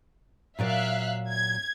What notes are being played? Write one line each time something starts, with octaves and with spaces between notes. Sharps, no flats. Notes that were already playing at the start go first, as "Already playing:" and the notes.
A#2 F#3 D5 E5 F5 F#6
G#6